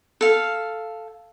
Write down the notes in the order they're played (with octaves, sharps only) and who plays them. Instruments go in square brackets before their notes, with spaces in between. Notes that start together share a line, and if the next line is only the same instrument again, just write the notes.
[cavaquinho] A4 F5